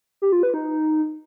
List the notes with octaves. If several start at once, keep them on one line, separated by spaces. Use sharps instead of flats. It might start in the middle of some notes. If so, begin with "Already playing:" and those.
G4
F4
B4
D#4